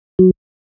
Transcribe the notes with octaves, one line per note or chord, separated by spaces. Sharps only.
F#3